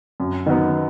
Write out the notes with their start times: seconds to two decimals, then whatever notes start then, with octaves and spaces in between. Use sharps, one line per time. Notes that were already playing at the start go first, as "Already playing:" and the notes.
0.20 F#2
0.46 D#3 F#3 B3